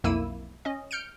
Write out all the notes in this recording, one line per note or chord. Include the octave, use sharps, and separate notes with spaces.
B1 F2 A#3 E4 E6 D#7
C#4 D#5
F6 G6 C#7 D7